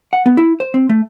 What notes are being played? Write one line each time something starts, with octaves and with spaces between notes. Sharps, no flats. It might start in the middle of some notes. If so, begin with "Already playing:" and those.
F#5
B3
E4
C5
C4
A3